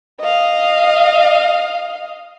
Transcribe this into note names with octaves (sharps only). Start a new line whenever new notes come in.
D#5 F5